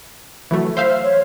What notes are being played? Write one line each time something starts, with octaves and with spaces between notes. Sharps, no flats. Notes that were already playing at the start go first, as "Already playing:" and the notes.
E3 F#3 A3
C5 E5 F5
C#5